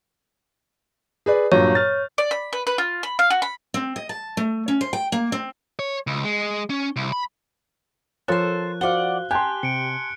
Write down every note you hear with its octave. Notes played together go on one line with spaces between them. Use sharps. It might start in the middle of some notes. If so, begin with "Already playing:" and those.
G#4 B4 D5
G2 A#2 F#3 C#5
F6 A6
D5
B5
B4
B4
F4
B5
F5
F#4
B5
C4
D#5
A5
A3
C#4
C5
G5
A#3
C4
C#5
C#2
G#3
C#4
C2
B5
F3 F4 A4 A#4 C5 C#5 F#6
F#4 C5 D5 F5 F#5 G7
G4 G#5 A5 C6 F#6
C3 C#7 D7